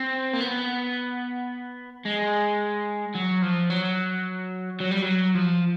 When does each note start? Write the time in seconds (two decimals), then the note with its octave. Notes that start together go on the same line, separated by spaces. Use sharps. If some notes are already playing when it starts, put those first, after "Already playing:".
Already playing: C4
0.33 A#3
0.40 B3
2.06 G#3
3.15 F#3
3.42 F3
3.70 F#3
4.80 F#3
4.91 G3
5.02 F#3
5.35 F3